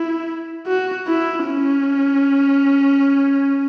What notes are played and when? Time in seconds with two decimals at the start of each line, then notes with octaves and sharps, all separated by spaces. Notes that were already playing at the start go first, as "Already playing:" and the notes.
Already playing: E4
0.67 F#4
1.07 E4
1.47 C#4